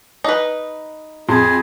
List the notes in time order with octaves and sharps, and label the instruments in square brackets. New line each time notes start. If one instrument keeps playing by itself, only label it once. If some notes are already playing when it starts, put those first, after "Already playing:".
[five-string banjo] D#4 B4
[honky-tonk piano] F2 C6 [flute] G#4